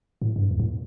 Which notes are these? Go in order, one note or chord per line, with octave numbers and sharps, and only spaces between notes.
A2
G2
E2
A2